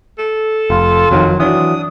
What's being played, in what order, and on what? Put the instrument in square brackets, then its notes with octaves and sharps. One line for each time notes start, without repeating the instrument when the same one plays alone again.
[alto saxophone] A4
[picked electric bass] F1 [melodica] F4
[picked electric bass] F2 D#3 [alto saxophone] F#3
[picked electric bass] E3 F#3 [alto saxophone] D4 [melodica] D#6